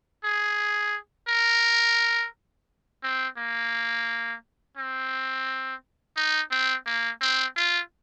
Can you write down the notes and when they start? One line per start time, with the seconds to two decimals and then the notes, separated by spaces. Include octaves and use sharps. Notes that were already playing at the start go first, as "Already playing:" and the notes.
0.24 G#4
1.29 A#4
3.03 C4
3.38 A#3
4.77 C4
6.17 D#4
6.51 C4
6.86 A#3
7.21 C4
7.56 F4